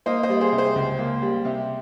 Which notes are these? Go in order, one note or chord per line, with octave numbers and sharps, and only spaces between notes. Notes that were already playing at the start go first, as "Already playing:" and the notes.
A#3 C5 D#5
C5 D#5
G3
G#4 C5
C3
G#4 C5
C#2
A#3
G3
C3